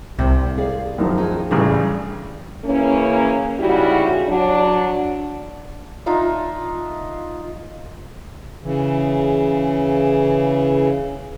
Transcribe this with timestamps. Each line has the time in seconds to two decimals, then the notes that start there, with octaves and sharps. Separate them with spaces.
0.19 C2 C3
0.57 G#4 D5 F5
0.98 F#2 D#3 F3
1.18 D#4 F4 G#4
1.51 A1 C#3 G3 C#4 D4 G#4
2.65 C#3 E3 A#3 C#4
3.60 G#2 C#3 G3 E4 F#4
4.28 F#3 D4
6.06 D4 D#4 F4 E5
8.63 C#3 E3